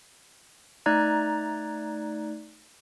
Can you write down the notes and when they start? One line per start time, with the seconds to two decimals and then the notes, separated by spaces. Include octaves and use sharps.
0.86 A3 D#4 D5 A#5 F#6 G#6